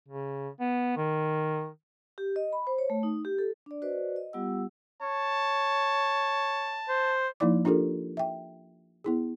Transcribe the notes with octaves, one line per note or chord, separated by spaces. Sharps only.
C#3
B3
D#3
G4
D#5
B5
C5
C#5
A3
D#4
G4
A4
D4 D5
F#4 B4 C5 D5 D#5
D#5
G3 B3 F4 G4 F#5 E6
C#5 A5
C5
F3 A#3 D#4 E4 D5 D6
D4 F4 G4 A4 A#4
E5 G5
B3 E4 G#4